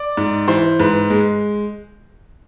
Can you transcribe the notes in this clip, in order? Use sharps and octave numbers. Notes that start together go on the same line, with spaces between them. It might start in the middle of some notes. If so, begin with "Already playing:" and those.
Already playing: D5
G#2
E3 C5
G#2 B4
G#3